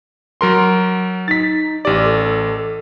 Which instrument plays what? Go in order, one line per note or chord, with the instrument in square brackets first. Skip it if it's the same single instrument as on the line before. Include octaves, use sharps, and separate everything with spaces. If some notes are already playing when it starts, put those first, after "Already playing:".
[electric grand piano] F#3 A#4 C6
[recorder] D#4 [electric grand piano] A6 B6
[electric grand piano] A1 D5 [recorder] G4
[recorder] A4